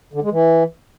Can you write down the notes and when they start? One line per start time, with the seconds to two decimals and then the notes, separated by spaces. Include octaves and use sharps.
0.14 D3
0.23 G#3
0.32 E3